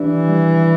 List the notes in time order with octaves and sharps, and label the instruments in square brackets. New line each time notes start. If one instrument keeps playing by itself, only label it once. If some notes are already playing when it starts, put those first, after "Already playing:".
Already playing: [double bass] E3 [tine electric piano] G3 D4 G4 D5
[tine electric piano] G3